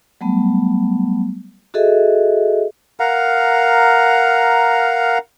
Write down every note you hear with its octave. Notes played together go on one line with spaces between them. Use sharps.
F#3 G3 A3 B3
F#4 G#4 A4 D#5 E5
A#4 F5 F#5 A#5